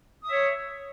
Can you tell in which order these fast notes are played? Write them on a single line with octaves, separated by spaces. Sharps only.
D#6 E5 C#5